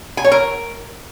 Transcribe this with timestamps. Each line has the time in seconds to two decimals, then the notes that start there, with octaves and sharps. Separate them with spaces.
0.17 G#5
0.24 C#5
0.32 A#4